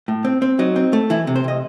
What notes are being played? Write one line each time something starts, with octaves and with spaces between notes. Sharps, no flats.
A2
C4
C4
F#3 D#4
C4
A3
E3 E4
C3
C5
C3 D#5